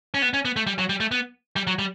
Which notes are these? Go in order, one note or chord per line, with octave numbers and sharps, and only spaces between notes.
C#4
B3
C#4
B3
A3
G3
F#3
G3
A3
B3
G3
F#3
G3